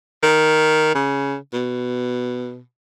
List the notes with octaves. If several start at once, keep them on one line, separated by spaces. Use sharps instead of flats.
D#3
C#3
B2